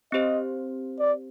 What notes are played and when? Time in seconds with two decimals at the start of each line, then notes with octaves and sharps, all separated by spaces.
0.12 C4 G4 C5 D#5
0.99 D5